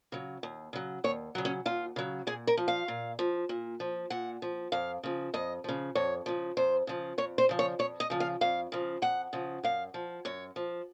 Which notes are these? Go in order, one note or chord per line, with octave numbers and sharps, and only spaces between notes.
C#3 F#3
D#2
C#3 F#3
D#2 C#5
C#3 F#3
C#4
D#2 F4
C#3 F#3
A#2 G#4
A#4
F3
F5
A#2
F3
A#2
F3
A#2 F#5
F3
F2 F5
C#3 F3
F2 D#5
C#3 F3
F2 C#5
C#3 F3
F2 C5
C#3 F3
F2 C#5
C5
C#3 F3
C#5
F2 C#5
D#5
C#3 F3
F5
F2 F5
C#3 F3
F2 F#5
C#3 F3
F#2 F5
F3
F#2 C#5
F3